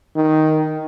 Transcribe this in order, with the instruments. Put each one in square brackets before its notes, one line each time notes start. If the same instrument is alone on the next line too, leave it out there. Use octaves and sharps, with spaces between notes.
[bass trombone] D#3